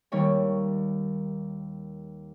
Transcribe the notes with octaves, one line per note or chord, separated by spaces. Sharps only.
D#2 D#3 G3 A#3 C#5 C#6